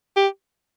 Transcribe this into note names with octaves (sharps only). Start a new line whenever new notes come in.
G4